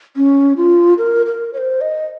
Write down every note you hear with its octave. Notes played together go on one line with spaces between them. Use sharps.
C#4
F4
A#4
A#4
C#5
C5
D#5